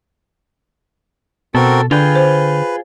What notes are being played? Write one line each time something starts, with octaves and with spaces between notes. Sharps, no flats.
B2 C4 F#4 A4 A#4
D3 F4 G#4 B4 G5
C5